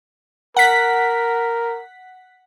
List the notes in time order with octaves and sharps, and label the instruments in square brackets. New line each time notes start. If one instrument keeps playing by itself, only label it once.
[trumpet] A#4 [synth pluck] F#5 B6